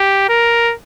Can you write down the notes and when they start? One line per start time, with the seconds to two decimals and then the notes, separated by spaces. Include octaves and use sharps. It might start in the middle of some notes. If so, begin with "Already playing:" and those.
Already playing: G4
0.29 A#4